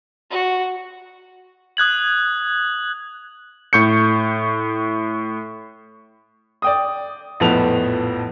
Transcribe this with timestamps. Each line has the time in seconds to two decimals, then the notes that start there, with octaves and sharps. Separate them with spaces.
0.30 F#4
1.77 D#6 F#6 G#6 F#7
3.73 A2 C#6 G6 C#7
6.62 D5 G5 D#6
7.40 A#1 F2 A2 B3 A5 F7